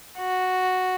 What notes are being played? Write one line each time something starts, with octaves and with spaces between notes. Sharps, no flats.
F#4